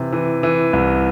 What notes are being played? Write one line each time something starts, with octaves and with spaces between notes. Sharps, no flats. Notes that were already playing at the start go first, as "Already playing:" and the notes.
Already playing: C3 E3
E3
E3
C2